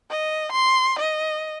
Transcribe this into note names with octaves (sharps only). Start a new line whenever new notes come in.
D#5
C6
D#5